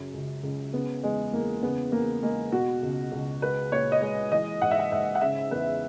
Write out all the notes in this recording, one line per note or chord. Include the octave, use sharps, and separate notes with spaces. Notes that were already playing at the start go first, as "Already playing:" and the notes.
Already playing: F#2 C#3
C#2
C#2
C#3 B3
E2 G#3
E2 A#3
C#3 B3
E2 A#3
G#3 A#3
B2 F#4
C#2
C#2
G#3 B4
A#2 C#5
D#5
G#3 C#5
E3 D#5
G#2 F#5
E5
F#5
G#2 E5
F#5
C#3 E5
E2 B4